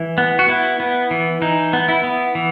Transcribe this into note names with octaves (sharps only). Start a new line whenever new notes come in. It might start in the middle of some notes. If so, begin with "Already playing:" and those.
Already playing: E3
B3
F#4
B3 E4
B3
E3
E3 D#4
B3
E4
B3
E3